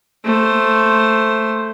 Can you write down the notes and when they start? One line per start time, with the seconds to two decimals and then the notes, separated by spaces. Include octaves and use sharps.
0.24 A3 C5